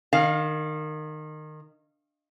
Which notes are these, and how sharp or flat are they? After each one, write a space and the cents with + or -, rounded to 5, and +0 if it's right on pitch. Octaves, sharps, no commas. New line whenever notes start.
D#3 -20 F5 +20